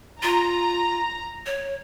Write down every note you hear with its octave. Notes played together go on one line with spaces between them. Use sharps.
F4 A#5
C#5